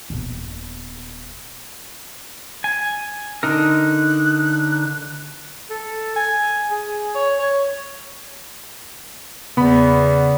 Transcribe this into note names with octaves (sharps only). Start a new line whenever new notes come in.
D#1 B3
G#5
D3 D#4 A#4 F#6
A4
G#5
G#4
C#5
C#5
E2 C#3 B3 B5